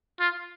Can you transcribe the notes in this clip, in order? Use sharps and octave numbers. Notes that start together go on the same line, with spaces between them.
F4